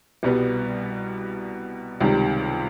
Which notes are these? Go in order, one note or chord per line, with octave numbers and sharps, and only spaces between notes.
C2 B2 G3 B3
C#2 C3 D#3 G3